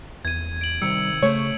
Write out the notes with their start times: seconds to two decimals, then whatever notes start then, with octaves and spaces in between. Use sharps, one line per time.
0.25 E2 G#6 D#7
0.61 D7 F#7
0.82 C3 D#3 G3 E6 C#7
1.23 C#3 A3 C5 C#5